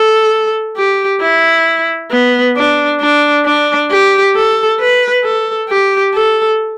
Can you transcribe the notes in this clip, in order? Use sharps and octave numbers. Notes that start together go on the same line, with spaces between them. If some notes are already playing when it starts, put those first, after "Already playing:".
Already playing: A4
G4
E4
B3
D4
D4
D4
G4
A4
B4
A4
G4
A4